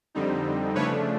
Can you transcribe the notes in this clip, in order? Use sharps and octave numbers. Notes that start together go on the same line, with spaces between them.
F2 D3 G3 C4 D#4
C#3 F3 A3 D4 B4 C#5